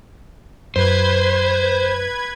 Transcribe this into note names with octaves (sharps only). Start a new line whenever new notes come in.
F#2 B4 C5 G#6